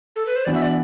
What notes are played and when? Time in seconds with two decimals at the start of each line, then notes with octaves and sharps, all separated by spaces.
0.16 A4
0.26 B4
0.36 C5
0.45 E3 B3 D4 F#4 D5
0.54 E5
0.62 D5